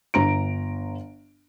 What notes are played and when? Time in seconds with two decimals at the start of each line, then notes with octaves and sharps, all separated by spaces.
0.14 G1 A#5 D7